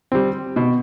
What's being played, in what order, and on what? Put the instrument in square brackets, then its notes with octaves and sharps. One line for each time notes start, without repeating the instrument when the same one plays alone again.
[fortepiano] G3 C4
B2